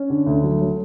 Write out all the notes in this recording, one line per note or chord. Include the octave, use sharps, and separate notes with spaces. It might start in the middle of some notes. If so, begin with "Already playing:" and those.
Already playing: C#4
D3
D2
F#3
F#3